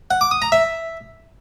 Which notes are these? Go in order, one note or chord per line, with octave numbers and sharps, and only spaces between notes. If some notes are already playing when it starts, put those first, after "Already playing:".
F#5
D6
D#6
A#5
E5